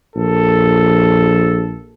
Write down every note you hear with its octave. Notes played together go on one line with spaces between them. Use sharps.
A#1 A4